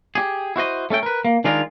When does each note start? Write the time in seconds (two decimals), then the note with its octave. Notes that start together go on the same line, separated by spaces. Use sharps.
0.15 G4 G#4
0.56 E4 F#4 C5 D#5
0.90 A3 C#4 A4 G5
1.03 A#4 B4
1.25 A#3
1.44 D#3 G#3 D4 F4 G#4 A#4